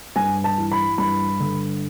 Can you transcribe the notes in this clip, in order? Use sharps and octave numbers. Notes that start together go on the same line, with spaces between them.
G2 G#5
A5
E3
B5
G2 B5
D3